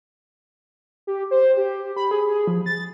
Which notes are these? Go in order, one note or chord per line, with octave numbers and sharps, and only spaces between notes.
G4
C5
G4
B5
G#4
F3
A6